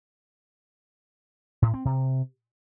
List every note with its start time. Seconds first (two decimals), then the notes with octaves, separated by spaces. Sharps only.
1.62 A2
1.74 C4
1.85 C3